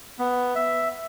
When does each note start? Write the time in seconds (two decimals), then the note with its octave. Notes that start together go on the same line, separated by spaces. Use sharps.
0.19 B3
0.55 E5